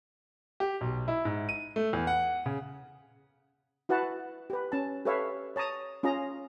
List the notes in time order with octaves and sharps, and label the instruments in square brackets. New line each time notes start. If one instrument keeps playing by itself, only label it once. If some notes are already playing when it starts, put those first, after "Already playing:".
[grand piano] G4
B1
E4
G#2
D#7
A3
E2
F#5
C#3
[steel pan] E4 F#4 B4 F#5 A5
G4 B4
C#4 A5
G4 A4 B4 C#5 E5 F5
C#5 A5 A#5 D#6
C#4 F4 G#4 D#5 A#5